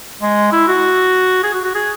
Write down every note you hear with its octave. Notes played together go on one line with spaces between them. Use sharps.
G#3
E4
F#4
G#4
F#4
F#4
G#4